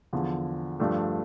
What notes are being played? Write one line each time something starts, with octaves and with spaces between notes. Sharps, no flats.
E2 D3 F3
G2 F3 A3 D4 G4